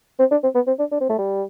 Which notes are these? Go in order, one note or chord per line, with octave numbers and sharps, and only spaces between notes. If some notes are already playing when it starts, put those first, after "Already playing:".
C4
D4
C4
B3
C4
D4
D4
C4
A3
G3